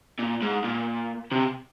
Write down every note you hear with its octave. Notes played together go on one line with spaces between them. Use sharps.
A#2
G#2
A#2
C3